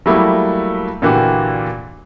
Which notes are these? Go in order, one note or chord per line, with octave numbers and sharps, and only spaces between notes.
F#3 G3 A3 A#3 E4
A#2 D3 E3 A#3 F#4 G4